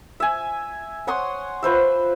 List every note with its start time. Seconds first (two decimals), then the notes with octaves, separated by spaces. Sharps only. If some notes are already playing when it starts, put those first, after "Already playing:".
0.20 E5 G#5
1.07 C#5 F#5 C6 D#6
1.63 F4 B4 C5 E5